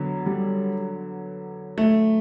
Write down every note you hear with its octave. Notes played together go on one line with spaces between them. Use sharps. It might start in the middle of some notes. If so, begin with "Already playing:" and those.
Already playing: D3 F#3 B3
G3
A3